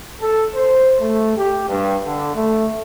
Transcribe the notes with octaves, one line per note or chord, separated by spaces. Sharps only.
A4
C5
A3
G4
G2
D3
A3